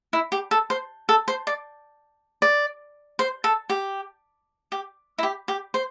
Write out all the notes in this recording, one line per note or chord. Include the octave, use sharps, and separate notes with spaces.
E4
G4
A4
C5
A4
C5
D5
D5
C5
A4
G4
G4
E4
G4
G4
C5